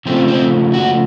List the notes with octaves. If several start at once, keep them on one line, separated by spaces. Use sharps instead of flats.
C#3 F3 A3 C4
C4
F#4